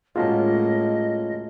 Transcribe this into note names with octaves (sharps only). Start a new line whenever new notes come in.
A2 G#3 A#3 C#4 F4 F#4 D#5 A5